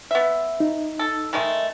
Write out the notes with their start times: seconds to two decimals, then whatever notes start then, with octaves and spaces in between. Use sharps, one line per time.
0.11 B3 E5
0.60 D#4
0.99 A4
1.33 D#3 G#3 A3